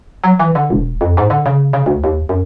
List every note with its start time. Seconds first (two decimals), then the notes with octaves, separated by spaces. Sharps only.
0.24 F#3
0.40 E3
0.55 D3
0.70 E1
1.01 F2
1.17 G#2
1.30 D3
1.46 C#3
1.73 C#3
1.86 D2
2.04 D#2
2.29 F#2